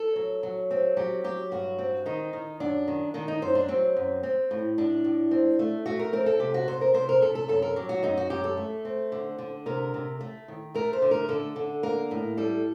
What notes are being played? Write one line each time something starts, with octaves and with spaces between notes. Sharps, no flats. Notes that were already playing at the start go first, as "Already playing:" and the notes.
Already playing: A4
F#3
F#3
C4
F#3 G4
F#3 G4
G2 F#4
C4
D#3 D#4
D#3
F#2 D4
D#3
D#3 D4
D#4
F#2 C5
D4
F#3 C4
F#2
C4
A2
A2 D4
A2
C4
A3
A3 F#4
A#4
C4 A#4
A4
C3 G4
F#4
C3 C5
A#4
C3 C5
A#4
C3 A4
A4
F#2 A4
A#4
F#3 G4
F#4
F#2 D#4
F#4
F#2 G4
A4
A3
C4
D3
D3
C3 A#4
C3
A3
D#3
A3 A#4
C5
D3
A#4
D3 A4
D3
A#3 A#4
A2
G3 A4